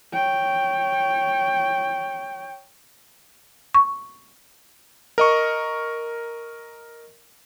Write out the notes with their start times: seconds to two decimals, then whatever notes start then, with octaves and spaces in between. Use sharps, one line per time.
0.13 C#5 G5
3.74 C#6
5.18 A#4 D#5 C#6